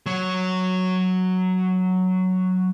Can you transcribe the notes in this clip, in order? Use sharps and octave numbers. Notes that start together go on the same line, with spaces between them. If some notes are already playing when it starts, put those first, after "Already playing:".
F#3 C#5